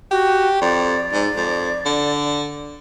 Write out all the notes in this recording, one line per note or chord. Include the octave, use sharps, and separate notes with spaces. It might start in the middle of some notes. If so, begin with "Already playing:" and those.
F#4 G4
F2 D5
G#2
F2
D3